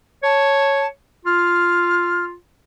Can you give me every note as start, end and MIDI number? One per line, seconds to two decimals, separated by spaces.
0.23 0.86 73
0.23 0.86 81
1.26 2.36 65
1.26 2.24 89